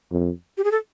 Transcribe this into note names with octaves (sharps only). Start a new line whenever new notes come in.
F2
G4
G#4
A4